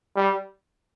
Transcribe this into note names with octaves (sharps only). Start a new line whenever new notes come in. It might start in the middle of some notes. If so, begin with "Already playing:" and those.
G3